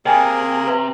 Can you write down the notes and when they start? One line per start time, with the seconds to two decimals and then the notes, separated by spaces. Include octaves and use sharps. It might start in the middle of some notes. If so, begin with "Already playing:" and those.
0.06 C3 A#3 G#4 A#4 D#5 G5 G#5
0.67 B4 E5